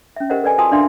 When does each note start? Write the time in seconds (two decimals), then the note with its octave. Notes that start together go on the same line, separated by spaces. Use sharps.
0.16 C#4 E5
0.30 G4 A#4 C5 D#5 F#5
0.43 A4 B4 D5 G#5
0.58 F4 F#4 G#5 A5 D#6 E6
0.72 D4 D5 E5 F5 C6